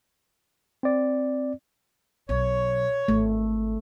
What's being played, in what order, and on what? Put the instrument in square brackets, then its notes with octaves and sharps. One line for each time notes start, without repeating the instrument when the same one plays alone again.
[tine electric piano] C4 D5
[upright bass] B1 [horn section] C#5
[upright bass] G#1 [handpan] A3